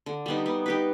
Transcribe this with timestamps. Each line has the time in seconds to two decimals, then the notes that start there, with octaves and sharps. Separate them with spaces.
0.06 D3
0.26 G3 B3 D#4
0.46 B3
0.66 D#4 G4 B4